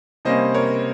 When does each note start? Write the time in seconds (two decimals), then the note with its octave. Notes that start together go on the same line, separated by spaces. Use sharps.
0.25 C3 G3 A#3 C#4 C5 D#5
0.54 A#4 C#5